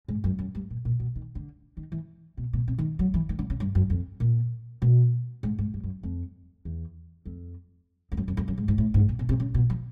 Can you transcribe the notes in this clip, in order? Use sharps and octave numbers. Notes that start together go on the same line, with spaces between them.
G#2
F#2
F#2
G2
A#2
A#2
B2
D#3
D3
D#3
E3
B2
B2
C3
D#3
F#3
E3
D#3
D3
C#3
G2
F#2
F2
A#2
B2
G#2
G#2
G2
F#2
F2
E2
F2
F2
F#2
F#2
F2
F#2
G#2
G#2
A2
G#2
A#2
B2
C3
C#3
B2
F3